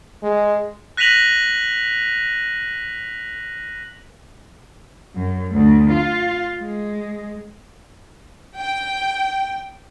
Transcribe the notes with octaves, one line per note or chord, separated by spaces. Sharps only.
G#3
F#6 A#6 B6 D#7 F7 F#7
F#2
D2
F4
G#3
G5